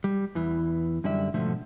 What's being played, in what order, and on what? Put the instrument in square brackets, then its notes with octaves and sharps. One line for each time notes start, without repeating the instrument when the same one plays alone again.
[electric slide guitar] G3
E2 E3
F#2 D3 G3 D5 E5
G#2 B2 D3 F3 A3